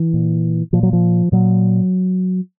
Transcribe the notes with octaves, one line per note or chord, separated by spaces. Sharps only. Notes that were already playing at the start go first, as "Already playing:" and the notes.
Already playing: E3
A#2
A#2 F3
F#3
F3
A#2 F#3